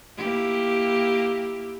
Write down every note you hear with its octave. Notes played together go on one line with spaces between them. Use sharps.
A#3 E4 G4